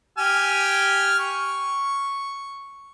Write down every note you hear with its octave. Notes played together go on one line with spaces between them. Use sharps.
G4 G#5 F6
C#6